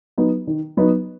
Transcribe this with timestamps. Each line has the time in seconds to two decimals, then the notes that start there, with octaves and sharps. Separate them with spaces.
0.18 F#3 B3 D#4
0.47 D#3
0.77 F#3 B3 D#4